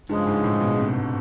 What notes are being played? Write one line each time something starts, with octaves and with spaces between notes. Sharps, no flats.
G2 C#3 F3 G#3
G#2
A2
B2
C3
B2